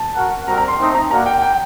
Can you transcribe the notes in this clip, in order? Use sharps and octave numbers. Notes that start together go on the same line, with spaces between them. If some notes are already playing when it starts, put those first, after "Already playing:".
Already playing: A5
F#4 A#4 F#5
G3 C4 F#4 A#4 A#5
A#5
C6
A3 C4 D#4
A#5
A#3 D4 F#4 A#4 F#5 A#5
G5
G5